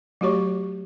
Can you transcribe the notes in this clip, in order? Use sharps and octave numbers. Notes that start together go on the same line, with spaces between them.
F#3 A3 F#4 G4 C#5 C#6